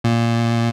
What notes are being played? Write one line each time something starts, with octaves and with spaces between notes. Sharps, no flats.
A#2